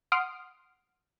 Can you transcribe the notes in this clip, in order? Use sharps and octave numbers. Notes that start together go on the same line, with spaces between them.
F#5 C6 D#6 F6 C7 D7